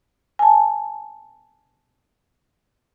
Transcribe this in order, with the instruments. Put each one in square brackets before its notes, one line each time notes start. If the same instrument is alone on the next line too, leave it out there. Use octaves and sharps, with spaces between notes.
[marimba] G#5 A5